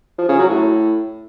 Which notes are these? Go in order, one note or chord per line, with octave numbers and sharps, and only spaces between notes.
F3
C#3
F#3
A2